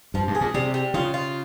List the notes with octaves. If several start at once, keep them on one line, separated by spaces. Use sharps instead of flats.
G2 F3
G2
G#4
A#2
C3 G3
G3
C#3 F4
F4